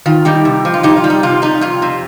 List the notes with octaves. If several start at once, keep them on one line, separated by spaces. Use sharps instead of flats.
D#3 F4
G3 D#4 G4
C3
F3
F4
G2 D#4 G4
F4
G3
D#4
C3 F4
G3 D#4
F2 F4
C3